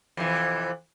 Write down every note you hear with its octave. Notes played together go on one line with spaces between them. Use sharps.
F2 C3 E3